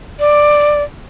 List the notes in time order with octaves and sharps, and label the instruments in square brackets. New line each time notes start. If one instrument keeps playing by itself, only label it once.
[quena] D5